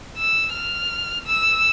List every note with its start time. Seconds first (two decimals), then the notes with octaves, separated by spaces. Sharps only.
0.17 E6
0.53 F6
1.26 E6